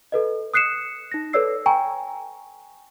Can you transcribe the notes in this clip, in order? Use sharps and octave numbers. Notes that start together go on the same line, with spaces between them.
A4 B4 D#5
D#6 F#6 C7 C#7 E7
D#4 A#6
A4 B4 C#5 D5 E6 C7
G5 G#5 A#5 C#6